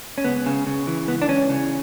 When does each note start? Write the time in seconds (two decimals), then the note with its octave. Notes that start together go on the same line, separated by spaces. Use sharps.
0.18 C#4
0.24 C#2 B3
0.46 C#3
0.67 C#3
0.87 E3
1.08 C#2 B3
1.22 D4
1.28 E3 C#4
1.49 C#3